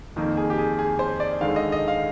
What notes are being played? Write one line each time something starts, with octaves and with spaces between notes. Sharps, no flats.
F2 D#3 A#3
G#4
G4
G#4
G#4
C5
D5
D#2 D3 G#3 F5
D#5
D#5
F5